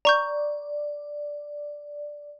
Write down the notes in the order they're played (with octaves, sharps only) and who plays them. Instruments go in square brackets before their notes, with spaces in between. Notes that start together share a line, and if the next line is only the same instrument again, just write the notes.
[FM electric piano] D5 [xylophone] A#5 C#6 G6